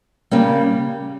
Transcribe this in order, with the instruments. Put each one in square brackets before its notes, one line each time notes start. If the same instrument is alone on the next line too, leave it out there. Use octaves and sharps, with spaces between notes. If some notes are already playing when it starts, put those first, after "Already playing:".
[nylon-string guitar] C#3 G3 A#3 C#4